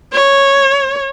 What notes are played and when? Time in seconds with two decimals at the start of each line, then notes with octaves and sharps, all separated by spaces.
0.12 C#5